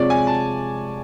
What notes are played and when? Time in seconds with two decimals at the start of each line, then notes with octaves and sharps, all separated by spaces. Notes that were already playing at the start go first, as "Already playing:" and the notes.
Already playing: C3 F3 G#3 C#5 D5
0.10 G#5
0.27 A5